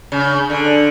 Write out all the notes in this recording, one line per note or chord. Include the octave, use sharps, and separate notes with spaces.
C#3
D3